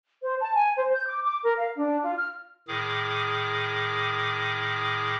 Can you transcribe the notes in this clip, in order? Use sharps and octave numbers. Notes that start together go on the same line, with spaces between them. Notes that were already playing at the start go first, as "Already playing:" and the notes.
C5
A5
G#5
C5
G6
D6
D6
A#4
F5
D4
F4
F6
A2 D#3 G#4 D6